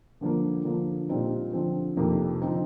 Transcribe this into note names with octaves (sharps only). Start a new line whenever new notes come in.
G2 D3 F3 A#3
D3 F3 A#3
A#2 G3 C4 D#4
D3 F3 C4
F2 C3 D#3 A#3
D3 F3 C4 D#4